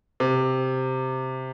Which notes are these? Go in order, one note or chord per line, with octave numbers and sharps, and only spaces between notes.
C3